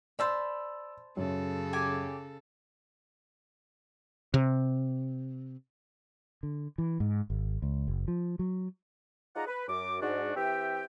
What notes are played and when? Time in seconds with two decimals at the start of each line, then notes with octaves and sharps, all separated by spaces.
0.19 C5 D5 A5 B5 E6
1.17 F#2 C#3 A4
1.73 G4 G#5 D6
4.34 C3
6.43 D3
6.78 E3
7.00 G#2
7.30 G#1
7.62 C#2
7.88 F#1
8.08 F3
8.39 F#3
9.35 D#4 F4 G#4 D5 F#5 A#5
9.47 B4
9.68 F#2 D6
10.02 G#2 D4 F#4
10.36 E3 C4 G4 E5 G5